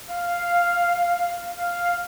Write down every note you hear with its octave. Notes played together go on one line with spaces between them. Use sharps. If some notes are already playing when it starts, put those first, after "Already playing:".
F5
F5